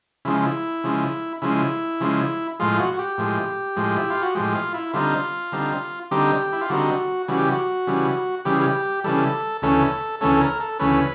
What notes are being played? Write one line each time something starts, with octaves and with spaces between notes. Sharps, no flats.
C#3 F3 G#3 E4
E4
C#3 F3 G#3
C#3 F3 G#3 E4
C#3 F3 G#3
A2 F3 G#3 F4
F#4
F#4
G4
A2 F3 G#3
A2 F3 G#3
E4
F4
F#4
A2 F3 G#3 G4
F4
E4
D3 G3 C4 D#4 F4
D3 G3 C4 D#4
D3 G3 C4 D#4 G4
E4
F4
D3 G3 C4 D#4 F#4
C#3 E3 G3 F#4
G4
F#4
C#3 E3 G3
C#3 E3 G3 G4
G#4
G4
C#3 E3 G3 A4
D2 C#3 E3 A3 C#4 A4
D2 C#3 E3 A3 C#4 A4
A4
A#4
A4
D2 C#3 E3 A3 C#4 B4